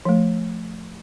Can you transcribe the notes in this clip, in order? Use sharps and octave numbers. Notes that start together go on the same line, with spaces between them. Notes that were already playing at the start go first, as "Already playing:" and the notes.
F3 A3